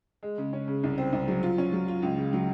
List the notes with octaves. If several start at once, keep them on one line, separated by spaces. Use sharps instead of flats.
G#3
C#3
C#4
C#3
C2
C4
C2
F#3
F4
C#4
F#3
F4
C#2
C#3
F#3